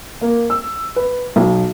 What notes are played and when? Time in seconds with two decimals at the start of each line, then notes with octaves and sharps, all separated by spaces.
0.21 A#3
0.50 E6
0.96 B4
1.36 B1